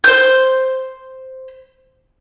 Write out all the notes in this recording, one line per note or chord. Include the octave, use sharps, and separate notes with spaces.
C5 G6